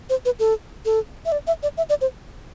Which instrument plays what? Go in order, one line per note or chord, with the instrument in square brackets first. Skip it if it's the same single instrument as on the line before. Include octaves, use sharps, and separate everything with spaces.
[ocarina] C5
B4
A4
A4
E5
D5
E5
D5
E5
D5
C5